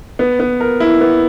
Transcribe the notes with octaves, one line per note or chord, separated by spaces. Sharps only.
B3
B3
A#4
E4
B3